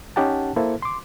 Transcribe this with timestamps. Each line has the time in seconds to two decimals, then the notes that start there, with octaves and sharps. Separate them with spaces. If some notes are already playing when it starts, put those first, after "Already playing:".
0.16 C#4 D#4 G4 F#5 A5
0.56 A#3 E4 A4 C5
0.82 C6 D6